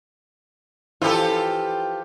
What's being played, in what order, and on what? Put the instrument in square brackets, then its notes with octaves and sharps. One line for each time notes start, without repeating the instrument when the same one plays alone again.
[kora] E3 F3 E4 [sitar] F4 G4 A4